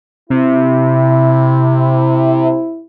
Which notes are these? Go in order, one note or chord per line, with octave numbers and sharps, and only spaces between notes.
C3 E4